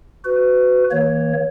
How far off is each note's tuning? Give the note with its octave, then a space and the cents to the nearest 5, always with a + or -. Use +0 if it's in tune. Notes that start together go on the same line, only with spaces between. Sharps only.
F#4 +0 B4 +30
E3 -45 A#3 +0 C#5 +0